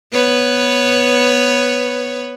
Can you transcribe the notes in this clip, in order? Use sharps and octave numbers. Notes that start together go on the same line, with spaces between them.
B3 B4 C#5